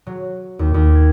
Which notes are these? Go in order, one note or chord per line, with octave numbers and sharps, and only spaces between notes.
F#3
D#2
D#2
G#6